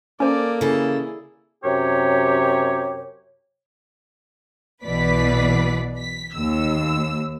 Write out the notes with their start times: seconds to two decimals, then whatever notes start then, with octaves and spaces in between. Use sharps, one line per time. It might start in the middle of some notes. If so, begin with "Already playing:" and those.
0.20 A#3 C#4 A4 C5 D5
0.61 C#3 E4 G#4 A4
1.64 F#2 C3 G4 C#5
4.85 B1 B2 E3 B4 D5 B6
5.98 B6
6.36 D#2 E6